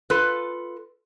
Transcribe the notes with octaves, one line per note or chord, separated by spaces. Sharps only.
F4 A4 B4